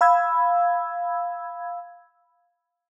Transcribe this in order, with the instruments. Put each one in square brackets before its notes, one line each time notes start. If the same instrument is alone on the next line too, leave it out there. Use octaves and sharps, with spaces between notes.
[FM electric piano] F5 B5 E6 G#6